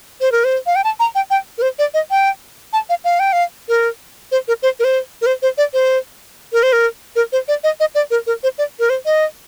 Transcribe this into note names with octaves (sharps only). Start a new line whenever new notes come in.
C5
A#4
C5
F5
G5
A5
A#5
G5
G5
A#4
C5
D5
D#5
G5
A5
F5
F5
G5
F5
A#4
C5
A#4
C5
A#4
C5
A#4
C5
C5
D5
C5
A#4
C5
A#4
A#4
C5
D5
D#5
D#5
D5
A#4
A#4
C5
D5
A#4
C5
D#5